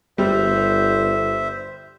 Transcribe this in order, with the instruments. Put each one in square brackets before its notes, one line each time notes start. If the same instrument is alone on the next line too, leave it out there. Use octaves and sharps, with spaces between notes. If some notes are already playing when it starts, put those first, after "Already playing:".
[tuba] G1 [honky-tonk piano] G3 [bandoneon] C5 E5